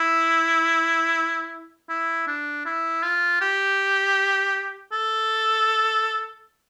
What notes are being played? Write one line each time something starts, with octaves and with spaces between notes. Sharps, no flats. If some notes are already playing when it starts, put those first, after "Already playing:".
Already playing: E4
E4
D4
E4
F4
G4
A4